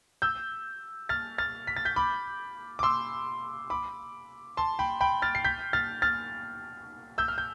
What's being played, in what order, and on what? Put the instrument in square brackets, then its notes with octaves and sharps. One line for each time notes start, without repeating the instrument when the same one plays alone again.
[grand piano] E6 G6
F6 A6
F6 A6
B6
A6
G6 B6
B5 D6
D6
C6 E6
B5 D6
A5 C6
G5 B5
G5 B5
F6 A6
C7
G6 B6
F6 A6
F6 A6
E6 G6
F6
G6